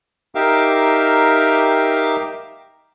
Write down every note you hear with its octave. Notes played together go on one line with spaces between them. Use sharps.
D#4 G4 A#4 E5 F5 D6